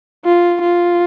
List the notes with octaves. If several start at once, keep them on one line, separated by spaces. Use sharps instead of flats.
F4
F4